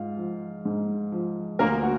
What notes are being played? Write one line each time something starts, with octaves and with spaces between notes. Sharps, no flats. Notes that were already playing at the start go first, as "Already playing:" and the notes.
Already playing: G#2 F4 F5
F3
G#2
F3
D2 A#3 A#4
F#4